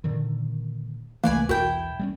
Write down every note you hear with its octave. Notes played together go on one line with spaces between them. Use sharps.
A#2 D3 D#3
C2 E3 A3 A#3 B4 D5 G#5
B1 E2 E4 F#4 A#4 G5
G3 G#3 C#4